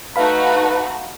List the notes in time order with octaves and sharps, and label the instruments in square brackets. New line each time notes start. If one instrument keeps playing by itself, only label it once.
[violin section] A3 D#4 F#4 [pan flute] B4 [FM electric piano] F5 B5